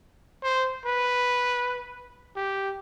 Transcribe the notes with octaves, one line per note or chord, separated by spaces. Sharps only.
C5
B4
G4